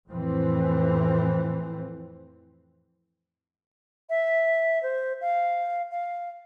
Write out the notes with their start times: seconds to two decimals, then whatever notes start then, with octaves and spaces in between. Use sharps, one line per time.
0.10 F2 A2 E3 C4
4.09 E5
4.83 C5
5.21 F5
5.91 F5